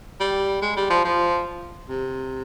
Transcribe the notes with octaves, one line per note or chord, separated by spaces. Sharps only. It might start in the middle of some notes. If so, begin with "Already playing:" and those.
G3
G#3
G3
F3
F3
C3